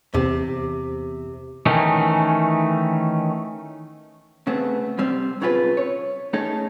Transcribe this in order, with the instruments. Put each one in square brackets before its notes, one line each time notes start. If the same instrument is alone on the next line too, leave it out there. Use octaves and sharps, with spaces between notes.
[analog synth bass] E2 [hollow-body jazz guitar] C3
[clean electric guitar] D#3 E3 A3 C#4 D#4
[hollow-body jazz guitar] C#3 A3 B3 C4
C2 G3 C4
B1 C#3 C4 F4 F#4 B4
C#5
A3 C#4 D#4 G#4 A4